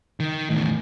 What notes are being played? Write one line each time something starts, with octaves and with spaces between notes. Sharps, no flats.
D#3
E2 A2